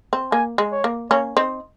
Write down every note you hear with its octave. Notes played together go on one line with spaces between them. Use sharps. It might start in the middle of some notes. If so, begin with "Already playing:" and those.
C4
A#3 G#5
G#3
C#5
A#3
A#3 C#4 C#5
C4 D#4